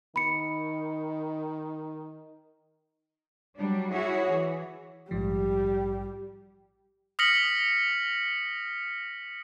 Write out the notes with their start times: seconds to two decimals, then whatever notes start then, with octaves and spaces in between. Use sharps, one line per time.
0.16 D#3 B5 C#7
3.57 F#3 G3 D4
3.92 E4 F#4 G#4 C#5
4.30 E3
5.11 A#1 G#2 F3 G3
7.19 D#6 F6 A#6 B6 C#7 F#7